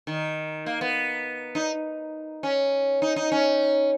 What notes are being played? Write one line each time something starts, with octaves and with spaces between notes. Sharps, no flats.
D#3
A#3
B3
D#4
C#4
D#4
D#4
C#4